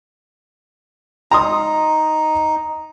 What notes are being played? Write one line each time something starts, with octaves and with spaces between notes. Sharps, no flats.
D#4 A#5 C6 D#6